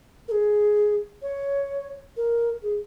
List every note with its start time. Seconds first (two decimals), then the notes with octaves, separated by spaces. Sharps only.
0.28 A#4
0.31 G#4
1.22 C#5
2.17 A#4
2.63 G#4